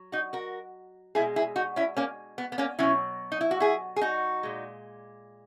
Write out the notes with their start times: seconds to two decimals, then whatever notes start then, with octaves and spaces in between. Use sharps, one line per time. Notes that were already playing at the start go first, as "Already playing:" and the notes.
Already playing: F#3
0.12 D#4 F#4
0.33 F#4 A#4
1.15 B2 G#3 E4 G#4
1.36 E4 G#4
1.56 D#4 F#4
1.76 C#4 E4
1.96 A#3 C#4
2.38 B3
2.52 B3
2.58 A#3 C#4
2.79 B2 F#3 C#4 E4
3.32 D#4
3.41 E4
3.51 F#4
3.60 E4 G#4
3.96 G#4
4.01 D#4 F#4
4.43 A#2 G#3